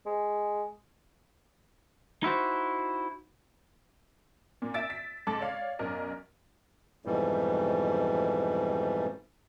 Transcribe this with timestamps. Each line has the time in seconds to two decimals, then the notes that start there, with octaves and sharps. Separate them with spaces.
0.06 G#3
2.23 D#4 E4 F#4 C5
4.62 A#2
4.74 E5 E6 A6 D7
4.90 B6
5.27 G#2 A4 D6 A6
5.41 C#5 D5 F5
5.79 B1 F#2 A#4 D5 D#5
7.05 F2 G#2 B2 E3 G3